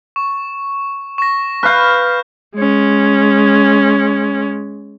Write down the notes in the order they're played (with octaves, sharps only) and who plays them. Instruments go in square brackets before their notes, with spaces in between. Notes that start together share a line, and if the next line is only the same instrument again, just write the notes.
[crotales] C#6
C#6 A#6
[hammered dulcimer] B4 F5 [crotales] F6 G6
[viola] G#3 C#4